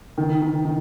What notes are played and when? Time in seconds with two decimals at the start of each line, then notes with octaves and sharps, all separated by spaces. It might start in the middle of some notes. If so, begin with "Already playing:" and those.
0.18 D#3
0.42 D#3
0.65 D#3